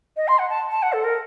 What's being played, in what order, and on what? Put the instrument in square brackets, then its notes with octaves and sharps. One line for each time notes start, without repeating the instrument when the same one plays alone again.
[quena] D#5
C6
F#5
A5
A5
F#5
A4
A#4